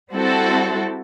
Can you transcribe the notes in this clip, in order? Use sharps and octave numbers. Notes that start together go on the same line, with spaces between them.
G3 C4 E4 F#4 A4